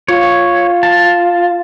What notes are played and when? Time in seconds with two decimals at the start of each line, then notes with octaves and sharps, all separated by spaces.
0.08 F4 C#5
0.83 A5